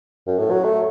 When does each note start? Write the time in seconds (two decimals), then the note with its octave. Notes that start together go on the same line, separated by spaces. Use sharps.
0.27 F#2
0.39 A2
0.51 F#3
0.64 A3